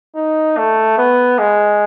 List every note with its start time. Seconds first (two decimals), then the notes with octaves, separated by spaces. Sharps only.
0.16 D#4
0.57 A3
0.98 B3
1.39 G#3